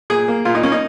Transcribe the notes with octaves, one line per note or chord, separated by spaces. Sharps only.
A#2 G#4
A#3
A#2 F4
D#4
A#3 C#4
D#4